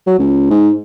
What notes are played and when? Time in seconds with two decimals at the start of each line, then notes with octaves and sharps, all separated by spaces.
0.07 F#3
0.19 C#2
0.50 G#2